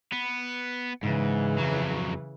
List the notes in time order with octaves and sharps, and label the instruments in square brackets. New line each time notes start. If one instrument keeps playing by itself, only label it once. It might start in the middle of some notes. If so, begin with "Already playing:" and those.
[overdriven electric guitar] B3
[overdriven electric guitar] G#2 [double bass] C#3 E3
[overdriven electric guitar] F2 F#3